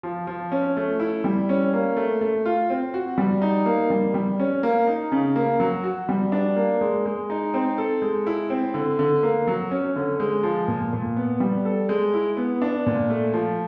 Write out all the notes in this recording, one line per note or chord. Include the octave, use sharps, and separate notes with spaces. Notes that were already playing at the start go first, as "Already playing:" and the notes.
F3
F3
C#4
A3
E4
G3
C#4
A#3
A3
A3
F4
C4
F#4
G3
D#4
A#3
G3
G3
C#4
A#3
D#4
C#3
A#3
F#3
F#4
G3
D4
A#3
G#3
G#3
D#4
C4
A4
G#3
E4
C4
D3
D3
A#3
F#3
C#4
D3
G#3
F3
A#2
A#2
B3
G3
A4
G#3
E4
B3
D4
A#2
A3
F3